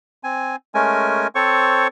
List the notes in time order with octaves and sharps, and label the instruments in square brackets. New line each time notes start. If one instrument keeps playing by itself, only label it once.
[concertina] C4 G#5
G#3 A3 C#4 A#4 G#5
C4 A4 C5 C#5 C#6